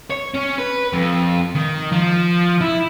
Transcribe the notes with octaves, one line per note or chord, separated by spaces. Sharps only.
C#5
C#4
B4
F2
D#3
F3
E4